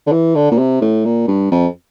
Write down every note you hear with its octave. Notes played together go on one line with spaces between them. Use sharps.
D3
E3
D3
A#2
C3
A2
A#2
G2
F2